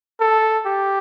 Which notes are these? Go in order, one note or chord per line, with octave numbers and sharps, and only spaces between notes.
A4
G4